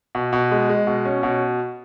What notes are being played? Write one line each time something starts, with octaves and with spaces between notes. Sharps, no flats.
B2
B2
G#3
G#3
B2
C#4
B2